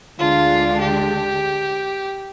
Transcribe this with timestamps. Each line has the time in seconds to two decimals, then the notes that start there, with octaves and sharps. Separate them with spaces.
0.19 D2 D3 G#3 D4 F4
0.80 G4